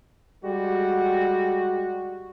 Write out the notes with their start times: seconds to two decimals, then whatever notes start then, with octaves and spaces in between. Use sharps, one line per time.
0.44 G3 G#3 F#4